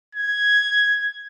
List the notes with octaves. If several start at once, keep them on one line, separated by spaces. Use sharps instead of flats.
G#6